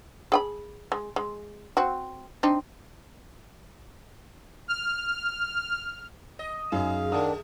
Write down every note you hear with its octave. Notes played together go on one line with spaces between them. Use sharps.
G#4 G5 B5
G#3
G#3
C4 F#4
C4 D4 D#4
F6
D#5
F#2 D#4 G#4 F5
D#3 F#3 A3 D4 F#5 D#6